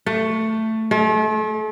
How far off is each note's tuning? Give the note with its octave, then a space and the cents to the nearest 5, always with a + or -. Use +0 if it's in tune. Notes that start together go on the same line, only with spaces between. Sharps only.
A3 +10
A3 -40